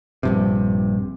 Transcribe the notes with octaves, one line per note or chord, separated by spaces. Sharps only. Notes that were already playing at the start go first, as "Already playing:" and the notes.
A#1 G2 C3